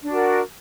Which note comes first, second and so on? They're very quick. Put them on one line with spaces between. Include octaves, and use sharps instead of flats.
D4 F#4 A#4